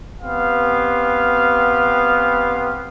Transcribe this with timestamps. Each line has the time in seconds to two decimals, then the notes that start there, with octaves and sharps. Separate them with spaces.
0.21 B3 C4 G4 F5